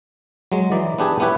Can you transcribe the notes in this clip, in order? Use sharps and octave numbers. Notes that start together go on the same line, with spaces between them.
F#3 G#3
E3 D#4 D5
B3 D4 G4 G#4
B3 E4 G4 B4 C#5